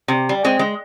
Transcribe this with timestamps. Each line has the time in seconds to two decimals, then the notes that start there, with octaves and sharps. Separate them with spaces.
0.08 C3
0.29 G3
0.44 G#3 C4
0.59 G#3